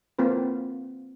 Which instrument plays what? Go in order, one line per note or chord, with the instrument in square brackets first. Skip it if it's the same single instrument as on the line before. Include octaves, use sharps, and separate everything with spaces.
[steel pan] A#3 C4 F4 B4